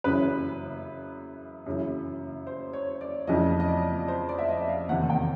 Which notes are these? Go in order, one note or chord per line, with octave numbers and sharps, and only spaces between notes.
F#2 C#3 E3 B4
F#2 C#3 E3
C5
C#5
D5
F2 C#3 E3 D#5
D#5
D5
C5
D5
E5
D#5
F5
E2 C3 D#3 F#5
G5